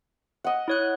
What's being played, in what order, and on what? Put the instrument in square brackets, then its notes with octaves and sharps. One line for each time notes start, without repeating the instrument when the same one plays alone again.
[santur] D#5 F#5
[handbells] E4 C#5 F#6